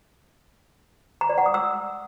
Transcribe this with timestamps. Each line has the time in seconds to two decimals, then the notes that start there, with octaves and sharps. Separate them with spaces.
1.21 A#5
1.29 D5
1.38 F#5
1.46 D#6
1.54 E6